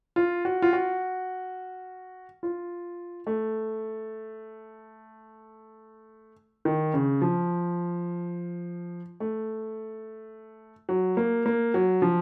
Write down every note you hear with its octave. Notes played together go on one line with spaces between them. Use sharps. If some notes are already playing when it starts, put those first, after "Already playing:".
F4
F#4
F4
F#4
F4
A3
D#3
C#3
F3
A3
F#3
A#3
A#3
F#3
F3